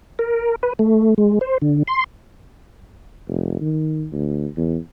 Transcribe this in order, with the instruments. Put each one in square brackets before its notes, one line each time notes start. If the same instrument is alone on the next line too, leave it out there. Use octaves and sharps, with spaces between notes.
[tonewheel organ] A#4
B4
A3
G#3
C5
D3
C6
[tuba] F1
D#3
D2
E2